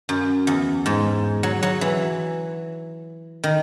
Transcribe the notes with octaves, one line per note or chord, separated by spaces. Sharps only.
F#2
E2
G#2
F#3
F#3
E3
D#3